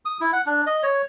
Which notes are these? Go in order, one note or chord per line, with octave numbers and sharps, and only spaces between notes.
D#6
E4
F#5
D4
D#5
C#5